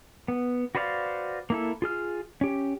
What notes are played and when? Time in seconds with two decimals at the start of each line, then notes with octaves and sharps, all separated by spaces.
0.28 B3
0.75 F#4 B4 C5 D5 F5
1.50 A#3 E4 A4
1.82 F4 G#4 F6
2.41 C#4 G4